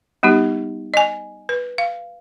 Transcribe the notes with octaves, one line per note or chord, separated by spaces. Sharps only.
G3 B3 D#4 G4
D#5 G#5
B4
F5